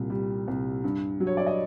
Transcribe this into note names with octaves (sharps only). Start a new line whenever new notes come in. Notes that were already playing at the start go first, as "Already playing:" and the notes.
Already playing: C2 A#2
G3
C2
G2
F#3
C#5
D5
D#5